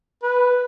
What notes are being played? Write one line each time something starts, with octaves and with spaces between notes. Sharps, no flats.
B4